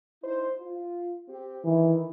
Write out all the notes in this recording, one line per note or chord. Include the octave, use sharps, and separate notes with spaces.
D#4 E4 C5
F4
C4 G4
D#3 E3 E4